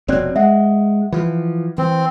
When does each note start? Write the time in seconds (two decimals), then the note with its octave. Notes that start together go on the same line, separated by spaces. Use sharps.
0.08 F1 B2 C4 C#5 D5 F#6
0.36 G#3 E5 F#5
1.12 E3 F3
1.78 E3 C4